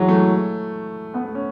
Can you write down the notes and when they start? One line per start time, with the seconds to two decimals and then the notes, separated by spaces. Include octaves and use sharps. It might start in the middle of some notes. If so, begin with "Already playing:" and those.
Already playing: E3 F#3 G#3
0.08 A3
1.14 B3
1.25 A3
1.35 C#4